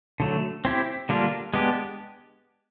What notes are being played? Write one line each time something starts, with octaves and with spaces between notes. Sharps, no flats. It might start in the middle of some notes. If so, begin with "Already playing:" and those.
D3 F#3 A3
C4 E4 G4
D3 G3 A#3 D4 F4
G#3 B3 D4 G4